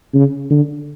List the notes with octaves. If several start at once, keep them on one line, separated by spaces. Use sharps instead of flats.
C#3
D3